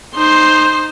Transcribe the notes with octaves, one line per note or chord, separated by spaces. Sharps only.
D#4 C5 C6